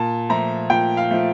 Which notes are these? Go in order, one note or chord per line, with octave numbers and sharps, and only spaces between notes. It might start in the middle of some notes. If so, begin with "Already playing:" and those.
Already playing: A#2 A5
F3 A3 A#5
A#2 G5
F5
F3 A3